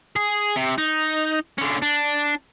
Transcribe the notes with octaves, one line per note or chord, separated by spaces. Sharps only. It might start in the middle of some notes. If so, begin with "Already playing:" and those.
G#4
C3
D#4
D3 C#4
D4